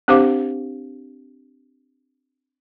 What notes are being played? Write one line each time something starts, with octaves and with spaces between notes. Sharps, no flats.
C4 D4 G4 C5 F5 D6